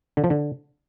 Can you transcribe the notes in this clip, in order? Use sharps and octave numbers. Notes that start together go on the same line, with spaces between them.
D3
F3
D3